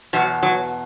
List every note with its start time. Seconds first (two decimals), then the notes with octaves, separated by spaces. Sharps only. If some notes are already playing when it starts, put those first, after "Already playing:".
0.13 E2 B2 F#3
0.43 F#3